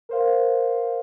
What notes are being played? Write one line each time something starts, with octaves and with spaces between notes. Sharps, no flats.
A#4 C5 F5